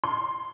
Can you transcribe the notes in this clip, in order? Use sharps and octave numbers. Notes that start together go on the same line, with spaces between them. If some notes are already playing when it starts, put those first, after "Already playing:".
C6